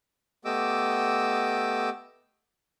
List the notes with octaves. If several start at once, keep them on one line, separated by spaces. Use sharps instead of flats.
A3 B3 G4 D#5 D6 E6